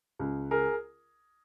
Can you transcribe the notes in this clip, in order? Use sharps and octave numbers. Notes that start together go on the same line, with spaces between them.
C#2
G#4 A#4